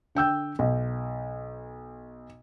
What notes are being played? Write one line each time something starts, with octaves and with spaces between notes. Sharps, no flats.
D3 G5 E6 G6
B1